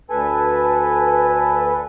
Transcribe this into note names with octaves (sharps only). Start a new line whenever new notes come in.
D2 A4 B4 G#5